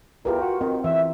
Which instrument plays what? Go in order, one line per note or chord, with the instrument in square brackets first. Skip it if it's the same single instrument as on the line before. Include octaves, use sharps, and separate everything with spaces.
[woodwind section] E2 [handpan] F4 G4 A#4
[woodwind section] F#4
[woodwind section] D#3 [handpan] C4
[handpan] E3 [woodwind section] E5